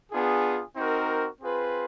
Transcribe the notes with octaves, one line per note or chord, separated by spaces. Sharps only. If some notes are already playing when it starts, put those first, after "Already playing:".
B3 D4 F4 G#4
C4 D#4 F#4 A#4
C4 F4 G#4 B4